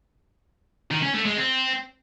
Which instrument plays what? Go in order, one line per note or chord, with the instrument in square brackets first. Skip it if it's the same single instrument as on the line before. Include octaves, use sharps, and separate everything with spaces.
[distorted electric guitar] D#3
C#4
A3
G#3
C4